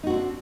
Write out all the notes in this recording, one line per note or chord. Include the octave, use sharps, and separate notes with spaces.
C4 D4 D#4 F#4